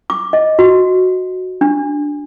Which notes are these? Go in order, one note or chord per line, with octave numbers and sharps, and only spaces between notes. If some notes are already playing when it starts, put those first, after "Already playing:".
D6
D#5
F#4
D4